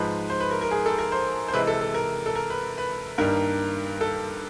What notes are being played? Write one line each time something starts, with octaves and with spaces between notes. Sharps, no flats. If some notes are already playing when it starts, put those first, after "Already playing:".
Already playing: G#2 F3 G#3 B4
C5
B4
A#4
A#4
G#4
A4
A#4
C5
C5
C3 E3 G#3 B4
A4
A4
A#4
A4
A#4
B4
B4
G2 D#3 G3 A#3 A#4
A4